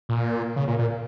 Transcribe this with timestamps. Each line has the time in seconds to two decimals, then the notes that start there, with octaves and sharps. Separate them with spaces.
0.09 A#2
0.56 C#3
0.68 A#2
0.79 A#2